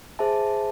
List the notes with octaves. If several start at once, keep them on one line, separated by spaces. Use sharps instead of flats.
G#4 C5 E5 A5